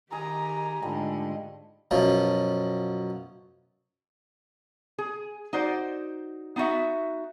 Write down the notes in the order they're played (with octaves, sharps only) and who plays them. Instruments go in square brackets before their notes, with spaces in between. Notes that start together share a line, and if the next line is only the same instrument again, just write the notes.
[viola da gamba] D#3 G4 [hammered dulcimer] G#4 D#5 [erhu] A#5
[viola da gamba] G#2 D3 D#5 [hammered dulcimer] F3 G3 A3
[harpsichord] F#2 B2 F3 F#3
[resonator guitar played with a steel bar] G#4
D#4 F#4 C5 D5
B3 D#4 E4 F#4 E5